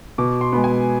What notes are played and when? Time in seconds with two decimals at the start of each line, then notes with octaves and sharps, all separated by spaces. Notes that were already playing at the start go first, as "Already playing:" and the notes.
0.18 B2 D6
0.41 C6
0.53 G#3 B3
0.64 G#5